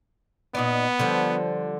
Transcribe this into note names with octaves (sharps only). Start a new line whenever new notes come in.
A#2 B3 D#4 D5
D3 F3 G3